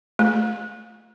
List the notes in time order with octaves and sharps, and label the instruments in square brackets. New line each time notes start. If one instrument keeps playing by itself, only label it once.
[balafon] A3